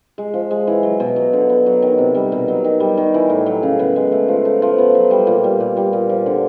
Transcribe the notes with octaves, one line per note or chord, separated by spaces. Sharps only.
G#3
F3
G#3
E3
F#3
B2
F#3
D3
B3
F#3
D#3
C3
G3
B2
F#3
D#3
G3
D#3
E3
A2
F#3
C#3
B3
G#3
A3
F3
A3
F3
B3
F#3
G3
A#2
G3
A#2
G3
A#2
F3
D3